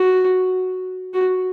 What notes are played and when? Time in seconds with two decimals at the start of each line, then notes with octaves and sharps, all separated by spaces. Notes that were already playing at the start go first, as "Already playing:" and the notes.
Already playing: F#4
1.14 F#4